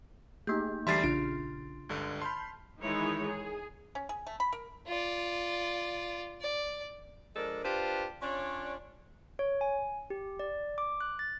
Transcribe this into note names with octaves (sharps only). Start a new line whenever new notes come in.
A3 A#3 D#4 G4 G#4 G6
D2 E3 G3 E5 A5 C6 A6 C7
A#1 C#3 D4 F4 F6 D7
C#2 G2 D3 G#6
A5 B5 C6 F6 G6
D#3 E3 G#3 D#4 E4 C#5
G#4
C#4
G#4
A3
B5
A#4
F4 D5
D5
F3 G#3 D4 A4 A#4
D4 F4 G4 B4 C5
C#4 D4 F4 C#5 D5
C#5
G#5
G4
D5
D6
F#6
A6